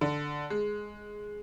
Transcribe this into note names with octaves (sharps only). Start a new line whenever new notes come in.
D3
G#3